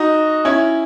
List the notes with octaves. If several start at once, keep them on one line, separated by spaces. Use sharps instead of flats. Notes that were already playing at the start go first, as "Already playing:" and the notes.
Already playing: D#4 F#4
C#4 E4